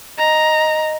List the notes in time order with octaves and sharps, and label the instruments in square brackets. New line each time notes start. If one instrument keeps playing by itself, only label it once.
[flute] D#5 [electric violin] A#5